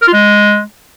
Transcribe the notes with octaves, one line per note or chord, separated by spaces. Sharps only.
A#4
F4
G#3